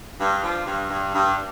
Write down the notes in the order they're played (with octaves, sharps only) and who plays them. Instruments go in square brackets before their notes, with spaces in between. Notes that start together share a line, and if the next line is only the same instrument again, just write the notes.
[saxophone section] G2 D4
F3
G2
G2
G2